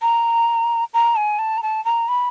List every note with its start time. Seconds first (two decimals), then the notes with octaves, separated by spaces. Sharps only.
0.02 A#5
0.94 A#5
1.16 G#5
1.39 A5
1.57 A#5
1.63 A5
1.85 A#5
2.08 B5